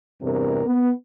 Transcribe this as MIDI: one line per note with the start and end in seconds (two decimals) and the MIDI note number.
0.22 0.62 40
0.22 0.62 43
0.22 0.62 48
0.22 0.62 60
0.22 0.62 70
0.66 0.90 59